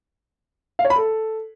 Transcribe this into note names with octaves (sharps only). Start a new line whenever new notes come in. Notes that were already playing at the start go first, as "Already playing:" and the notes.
F5
C#5
B5
A4